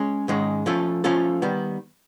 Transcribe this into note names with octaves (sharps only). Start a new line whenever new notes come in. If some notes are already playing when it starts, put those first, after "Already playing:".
Already playing: G#3 C#4
G#2 D#3 G#3 C#4
F3 A3 C#4 F4 A4
F3 A3 C#4 F4 A4
D#3 G3 B3